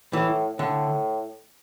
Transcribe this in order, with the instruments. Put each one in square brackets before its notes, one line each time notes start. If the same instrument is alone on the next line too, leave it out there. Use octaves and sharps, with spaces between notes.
[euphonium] A2 [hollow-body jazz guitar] E3
[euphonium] A2 [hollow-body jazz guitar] D3